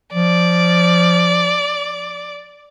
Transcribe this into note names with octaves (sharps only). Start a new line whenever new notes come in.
F3 D5